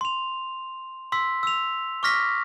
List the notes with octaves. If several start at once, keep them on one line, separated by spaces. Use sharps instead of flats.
C6 F7
C6 E6 B6
E6 F7
C#6 D6 F6 A#6 B6